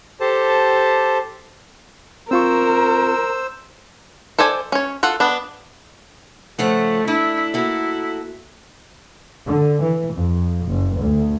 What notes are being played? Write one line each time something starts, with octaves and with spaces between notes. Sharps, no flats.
G4 A4 C5 A5
C4 F4 A#4 C5 C#6 E6
A4 C5 D5 G#5
C#4 C#5
F4 A4 F#5
B3 D4
C#3 F3 A3 F#5
D4 E4
A#3 E4 F#4 A4
D3
E3
F2
F#1
D2